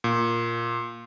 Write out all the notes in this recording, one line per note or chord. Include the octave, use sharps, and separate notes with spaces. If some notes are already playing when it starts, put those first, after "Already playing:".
A#2